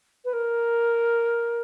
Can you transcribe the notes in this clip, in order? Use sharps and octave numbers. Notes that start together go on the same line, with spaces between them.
B4
A#4